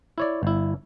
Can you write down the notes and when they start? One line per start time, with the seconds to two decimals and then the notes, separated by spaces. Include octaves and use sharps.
0.18 E4 C#5 D5
0.43 G1 E4